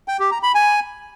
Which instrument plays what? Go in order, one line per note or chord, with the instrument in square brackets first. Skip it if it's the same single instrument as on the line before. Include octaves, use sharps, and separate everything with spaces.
[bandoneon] G5
G4
A#5
B5
G#5